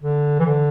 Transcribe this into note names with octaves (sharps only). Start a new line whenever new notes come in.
D3
E3
D3